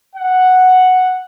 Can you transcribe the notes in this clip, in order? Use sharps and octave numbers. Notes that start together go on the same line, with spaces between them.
F#5